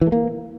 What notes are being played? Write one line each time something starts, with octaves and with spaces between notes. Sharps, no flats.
E3
A3
A#3